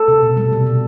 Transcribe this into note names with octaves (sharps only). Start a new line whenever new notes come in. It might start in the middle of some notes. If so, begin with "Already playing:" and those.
Already playing: A4
C3
B2
G3
B2
B2